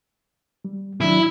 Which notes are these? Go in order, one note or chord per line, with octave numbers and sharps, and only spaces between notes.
G3
D#3 F#3 D4 E4